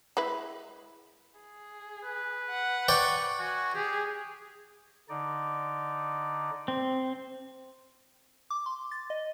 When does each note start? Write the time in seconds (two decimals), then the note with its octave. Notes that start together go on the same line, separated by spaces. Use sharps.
0.17 G#3 E4 B4
1.40 G#4
2.04 B4
2.50 F#5
2.88 B4 D5 G5 C#6
3.39 F#4 G#5
3.75 G4 G#4
5.09 D3 D#4 D5
6.68 C4
8.50 D6
8.66 C6
8.91 A6
9.10 D#5